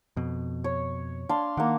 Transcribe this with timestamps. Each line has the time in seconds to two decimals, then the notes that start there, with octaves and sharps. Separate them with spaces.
0.16 F2 B2
0.64 C#5
1.29 D4 F5 C6
1.57 D#3 A#3 F#5